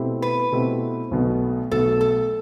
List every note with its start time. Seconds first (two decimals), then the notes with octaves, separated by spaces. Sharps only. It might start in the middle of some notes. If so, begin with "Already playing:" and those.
Already playing: B2 A3 C4 E4 G4
0.22 B4
0.52 B2 A3 C4 E4 G4
1.11 B1 B2 A3
1.71 B1 B2 A3 A4
2.01 A4